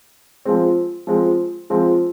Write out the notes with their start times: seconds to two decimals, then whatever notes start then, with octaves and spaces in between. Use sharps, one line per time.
0.45 F3 G#3 C4
1.07 F3 G#3 C4
1.70 F3 G#3 C4